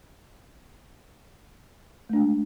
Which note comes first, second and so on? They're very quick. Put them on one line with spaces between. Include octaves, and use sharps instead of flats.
A3 D4 G#3